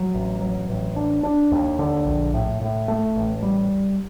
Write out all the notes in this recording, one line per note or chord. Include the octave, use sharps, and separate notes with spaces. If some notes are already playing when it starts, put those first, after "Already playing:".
Already playing: F#3
A1
F#3
A1
D4
D4
D#2
D3
A#1
A2
A2
A3
A1
G3